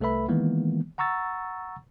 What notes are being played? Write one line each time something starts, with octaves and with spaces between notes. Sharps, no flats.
C2 A3 A4 B4 E5 B5
D#3 E3 G#3 A#3 B3
F#5 A#5 C#6 E6 A6